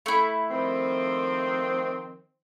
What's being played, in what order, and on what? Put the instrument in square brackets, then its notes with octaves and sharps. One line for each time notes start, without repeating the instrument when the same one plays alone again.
[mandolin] A3 E4
[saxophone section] D#3 F3 C4